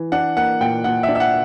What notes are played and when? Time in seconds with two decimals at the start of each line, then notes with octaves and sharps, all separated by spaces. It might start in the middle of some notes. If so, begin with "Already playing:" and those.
Already playing: E3
0.12 D4 F#5
0.37 A#3 F#5
0.61 A#2 G5
0.84 A#2 F#5
1.03 E5
1.08 D4
1.15 E5
1.20 F#5